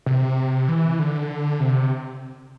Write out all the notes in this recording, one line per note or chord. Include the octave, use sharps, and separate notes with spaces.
C3
E3
D3
C3